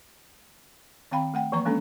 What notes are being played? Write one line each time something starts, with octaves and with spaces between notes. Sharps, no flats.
D#3 C4 F5 G5 B5
A3 F#5 G5
E3 F3 A#3 B4 A#5 C#6
G#3 A#3 C#4 D4 A4